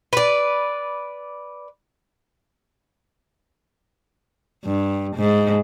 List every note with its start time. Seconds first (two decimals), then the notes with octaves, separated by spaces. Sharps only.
0.13 B4 D5
4.65 G2
5.16 G#2